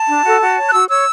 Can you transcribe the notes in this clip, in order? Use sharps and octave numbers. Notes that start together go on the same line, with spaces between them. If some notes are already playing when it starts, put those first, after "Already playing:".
Already playing: A5
D4
F#4 A4
F#4
C#5
F#6
F#4 E6
C#5 E6